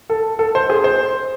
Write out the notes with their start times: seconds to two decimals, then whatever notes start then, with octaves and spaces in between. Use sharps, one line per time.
0.10 A4
0.39 A4
0.55 C5
0.70 G#4
0.84 C5